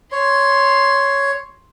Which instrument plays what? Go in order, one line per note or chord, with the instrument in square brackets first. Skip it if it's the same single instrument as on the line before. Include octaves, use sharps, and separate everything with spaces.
[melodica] C#5 [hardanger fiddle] C6